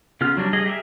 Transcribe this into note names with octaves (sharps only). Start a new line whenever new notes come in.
C#3 B3 F4 F6
F#3 G3 D4
G3 G#4 D#5
G4 G#4 A#4 D#5 E5